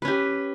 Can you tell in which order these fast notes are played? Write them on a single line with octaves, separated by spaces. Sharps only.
B4 C#4 G4